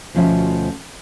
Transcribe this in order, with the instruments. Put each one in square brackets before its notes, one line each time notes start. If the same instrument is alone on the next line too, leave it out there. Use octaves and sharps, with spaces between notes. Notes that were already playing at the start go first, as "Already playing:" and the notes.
[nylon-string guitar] D2 B2 F3 C#4 C5 E5